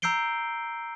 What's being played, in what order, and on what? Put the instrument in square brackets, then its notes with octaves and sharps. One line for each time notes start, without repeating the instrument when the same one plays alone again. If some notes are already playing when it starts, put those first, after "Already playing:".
[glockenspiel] A#5 E6 G6 C7 D7 G7